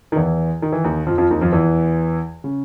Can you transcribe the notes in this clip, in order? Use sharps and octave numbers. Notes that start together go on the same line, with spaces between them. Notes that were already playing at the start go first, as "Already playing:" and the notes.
D#3
E2 E3
D#3
E3
D#2 D#3
F2 F3
F2 F3
D#2 D#3
F2 F3
E2 E3
C#3